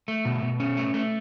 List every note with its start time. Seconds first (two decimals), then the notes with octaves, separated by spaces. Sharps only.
0.08 A3
0.25 B2
0.42 B2
0.60 C#4
0.77 A3
0.94 A3